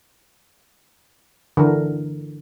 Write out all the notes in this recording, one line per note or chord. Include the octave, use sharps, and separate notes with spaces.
D3 E3 A#4